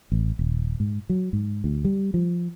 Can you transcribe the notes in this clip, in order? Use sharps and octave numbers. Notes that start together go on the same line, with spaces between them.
A1
D#1
G#2
F#3
G#2
D2
G3
F3